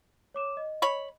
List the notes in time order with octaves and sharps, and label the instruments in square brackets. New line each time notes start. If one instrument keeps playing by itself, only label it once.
[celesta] C#5 D6 E7
D#5
[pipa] C#5 B5